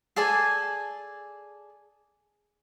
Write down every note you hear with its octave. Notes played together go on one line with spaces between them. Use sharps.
G#4 A4 D5 G#5